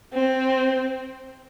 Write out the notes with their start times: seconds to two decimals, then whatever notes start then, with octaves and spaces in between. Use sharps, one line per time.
0.14 C4